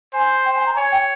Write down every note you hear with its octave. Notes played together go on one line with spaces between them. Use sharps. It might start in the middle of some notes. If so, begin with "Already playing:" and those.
C5 G#5
G5
G#5
A#5
C#5 G#5
G5